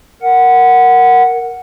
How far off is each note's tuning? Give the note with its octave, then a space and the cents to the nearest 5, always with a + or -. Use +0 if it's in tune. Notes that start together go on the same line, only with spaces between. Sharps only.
A#4 +0 F#5 +0